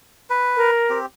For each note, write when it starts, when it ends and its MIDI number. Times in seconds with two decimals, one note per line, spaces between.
0.30 0.71 71
0.56 0.98 70
0.90 1.06 60
0.90 1.06 67